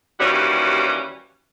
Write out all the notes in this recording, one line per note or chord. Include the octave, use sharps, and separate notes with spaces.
D#2 E3 G3 C#4 F#4